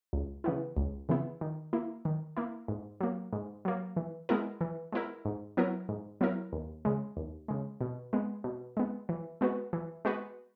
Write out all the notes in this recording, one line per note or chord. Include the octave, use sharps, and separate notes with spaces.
C#2
C#3 E3 B3 E4
C#2
C#3 E3 B3 E4
D#3
A#3 E4
D#3
A#3 E4
G#2
F#3 A#3
G#2
F#3 A#3
E3
G#3 B3 E4 A#4
E3
G#3 B3 E4 A#4
G#2
F#3 B3 E4 A#4
G#2
F#3 B3 E4 A#4
D#2
C#3 G#3
D#2
C#3 G#3
B2
G#3 B3
B2
G#3 B3
E3
G#3 B3 F#4 B4
E3
G#3 B3 F#4 B4